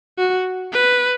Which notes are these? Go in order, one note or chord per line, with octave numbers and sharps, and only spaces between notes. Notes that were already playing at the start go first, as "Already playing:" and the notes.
F#4
B4